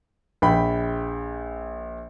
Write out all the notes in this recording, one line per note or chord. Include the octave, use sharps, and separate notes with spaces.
A#1 G5 B5